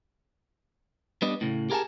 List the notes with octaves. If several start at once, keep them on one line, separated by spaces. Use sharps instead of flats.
G3 B3 D4 B4 D#5
A2 C#3
G4 G#4 A#4 E5 G#5 A5